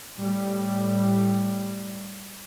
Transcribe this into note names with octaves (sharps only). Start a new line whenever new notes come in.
A2 G3